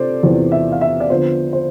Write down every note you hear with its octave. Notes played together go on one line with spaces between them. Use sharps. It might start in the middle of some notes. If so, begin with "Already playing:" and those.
Already playing: C3 F4 A4 C5 D5
E2 C3 E3 B3 F4 C5
E5
F5
E5
D5
D3 F3 B3 F4 C5
C5